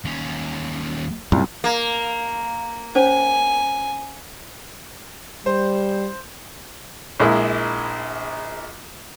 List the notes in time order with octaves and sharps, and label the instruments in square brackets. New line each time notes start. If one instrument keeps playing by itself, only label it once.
[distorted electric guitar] D#2 C#4
[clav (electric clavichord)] C2 [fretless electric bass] F#2 A#2
[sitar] A#3
[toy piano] C#4 C5 C#5 [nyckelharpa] G#5
[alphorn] G3 [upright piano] C5
[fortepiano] A#1 G#3 A#3 E4